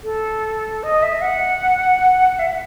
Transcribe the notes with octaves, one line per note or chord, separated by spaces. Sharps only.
A4
D#5
E5
F#5
E5